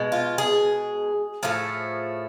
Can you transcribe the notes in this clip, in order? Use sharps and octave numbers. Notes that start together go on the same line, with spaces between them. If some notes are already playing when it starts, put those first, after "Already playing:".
Already playing: B2 G#3
F4
G#4
A2 F3 A3